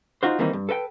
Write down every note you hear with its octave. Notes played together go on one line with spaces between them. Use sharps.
D#4 F4 F#4 C5
D#3 E3 G3 A#3 C4 D#4
G2
A4 B4 D#5 G5